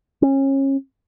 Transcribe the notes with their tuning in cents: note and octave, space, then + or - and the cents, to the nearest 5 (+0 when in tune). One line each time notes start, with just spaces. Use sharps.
C#4 -30